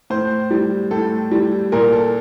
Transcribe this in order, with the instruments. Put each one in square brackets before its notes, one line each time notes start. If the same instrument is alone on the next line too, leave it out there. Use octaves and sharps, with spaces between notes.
[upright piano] A2 C5
G3
A2 A4
G3
A#2 A#4
A4